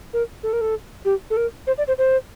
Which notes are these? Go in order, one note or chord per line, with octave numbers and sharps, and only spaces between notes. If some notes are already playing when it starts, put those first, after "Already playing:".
A#4
A4
A#4
A4
G4
A4
A#4
C5
D5
C5
C5